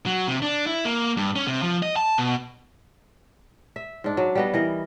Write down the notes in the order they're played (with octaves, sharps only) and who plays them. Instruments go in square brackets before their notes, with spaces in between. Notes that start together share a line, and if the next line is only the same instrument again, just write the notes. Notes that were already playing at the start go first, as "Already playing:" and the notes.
[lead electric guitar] F#3
C3
D4
E4
A#3
G2
C#4
C3
F3
D#5
A5
B2
[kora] E5
G#2 D4
F#3
G3 B3 D#5
E3 A#4 D#5